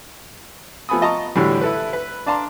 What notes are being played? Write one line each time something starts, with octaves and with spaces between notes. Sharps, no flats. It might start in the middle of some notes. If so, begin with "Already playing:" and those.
F3 A3 B3 G#5 B5 D#6
F4 D#5 A5 A#5 C#6
A2 D3 E3 F#3 G3
E4 A4 B4
B4
D4 D5 F5 A5 A#5 C6